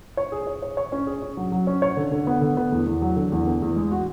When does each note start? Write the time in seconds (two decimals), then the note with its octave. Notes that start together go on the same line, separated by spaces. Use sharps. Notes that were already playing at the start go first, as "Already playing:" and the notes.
0.17 C#5
0.32 G#4
0.47 C#5
0.62 C#5
0.77 C#5
0.92 C#4
1.07 G#4
1.22 C#4
1.37 F#3
1.52 F#3
1.67 C#4
1.82 C#5
1.97 D3
2.12 D3
2.27 B3
2.42 D3
2.57 B3
2.72 E2
2.87 E2
3.02 F#3
3.16 D3
3.32 E2
3.46 B3
3.62 E2
3.76 G#3
3.92 F#4